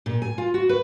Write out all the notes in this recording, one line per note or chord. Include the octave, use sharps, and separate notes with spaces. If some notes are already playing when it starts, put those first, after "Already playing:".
A#2
G#5
F4
F#4
B4